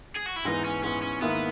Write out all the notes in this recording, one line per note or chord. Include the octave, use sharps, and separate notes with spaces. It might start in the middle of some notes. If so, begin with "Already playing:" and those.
G#4
F#4
E4
G#2 E3 B3 D#4
C#4
G#2 E3 B3 C#4
C#4
G#2 D#3 A#3 B3 E4